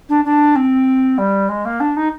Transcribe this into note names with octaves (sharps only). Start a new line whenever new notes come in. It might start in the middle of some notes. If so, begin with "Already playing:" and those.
D4
D4
C4
G3
G#3
A#3
D4
D#4